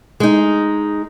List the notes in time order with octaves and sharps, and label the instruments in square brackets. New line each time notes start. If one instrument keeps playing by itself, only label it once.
[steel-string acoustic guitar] G#3 D#4